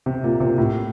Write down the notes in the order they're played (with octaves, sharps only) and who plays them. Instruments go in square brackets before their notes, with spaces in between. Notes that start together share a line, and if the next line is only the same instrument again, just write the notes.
[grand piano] C3
A#2
C3
A2